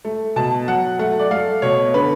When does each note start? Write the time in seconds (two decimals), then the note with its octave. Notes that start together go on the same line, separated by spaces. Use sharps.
0.05 A3
0.36 B2 A5
0.68 F#3 F#5
0.99 A3 F#5
1.19 D5
1.31 A3 F5
1.62 B2 C#5
1.94 D3 B4